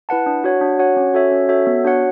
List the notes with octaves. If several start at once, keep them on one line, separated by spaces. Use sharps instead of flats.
E4 B4 F#5 A5
D4
F#4 C#5 F#5
D4
F#4 C#5 F#5
C#4
F#4 A4 C#5 E5
C#4
F#4 A4 C#5 E5
B3
D4 F#4 C#5 F#5